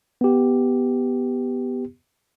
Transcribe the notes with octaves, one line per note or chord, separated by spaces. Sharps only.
B3 G4